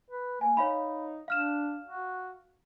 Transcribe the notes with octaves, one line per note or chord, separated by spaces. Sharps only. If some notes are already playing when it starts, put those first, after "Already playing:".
B4
A#3 G#5
D#4 C#5 F5 B5
D4 F5 F6 E7
F#4